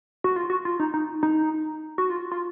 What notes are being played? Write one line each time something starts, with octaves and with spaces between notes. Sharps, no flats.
F#4
F4
F#4
F4
D#4
D#4
D#4
F#4
F4
F4